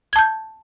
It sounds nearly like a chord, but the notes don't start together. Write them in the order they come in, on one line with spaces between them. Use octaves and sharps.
G#6 A5 G6